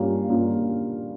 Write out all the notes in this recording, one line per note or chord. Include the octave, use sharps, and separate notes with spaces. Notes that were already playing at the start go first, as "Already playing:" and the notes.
Already playing: G2 G3 A#3 C#4 F4
G2 G3 A#3 C#4 F4